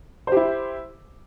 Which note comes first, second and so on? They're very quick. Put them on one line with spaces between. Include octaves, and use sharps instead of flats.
C5 G4 E4